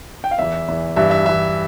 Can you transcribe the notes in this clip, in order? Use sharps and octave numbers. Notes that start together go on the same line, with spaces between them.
G5
F5
E2 E3 E5
E2 E3
G2 E3 E5
E5
G2 E3 E5